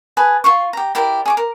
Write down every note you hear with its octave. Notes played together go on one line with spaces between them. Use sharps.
G#4 B4 G#5 A5
F4 C6 C#6
G4 A#5
E4 G4 A#4 D5
G#4 C#6 D6
A#4